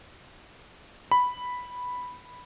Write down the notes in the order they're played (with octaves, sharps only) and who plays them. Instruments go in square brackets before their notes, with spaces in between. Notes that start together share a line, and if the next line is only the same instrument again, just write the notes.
[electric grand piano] B5